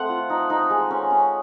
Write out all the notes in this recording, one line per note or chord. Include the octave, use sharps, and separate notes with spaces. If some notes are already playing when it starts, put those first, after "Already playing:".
Already playing: A3 C4 F#5
F4
D#4
D#4
G#3
C#4
C#4